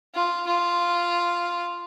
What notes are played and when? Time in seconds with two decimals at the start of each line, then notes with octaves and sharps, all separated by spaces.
0.14 F4
0.47 F4